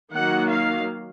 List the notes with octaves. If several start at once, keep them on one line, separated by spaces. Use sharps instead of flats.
D#3 F#3 A#3 F#5
F5